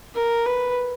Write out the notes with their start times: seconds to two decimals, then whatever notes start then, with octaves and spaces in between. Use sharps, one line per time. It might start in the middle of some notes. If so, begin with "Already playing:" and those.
0.16 A#4
0.46 B4